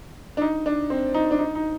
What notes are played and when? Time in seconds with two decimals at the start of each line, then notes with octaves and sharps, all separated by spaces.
0.37 D4
0.41 D#4
0.66 D4
0.90 C4
1.14 D#4
1.31 D4
1.39 D#4
1.55 D#4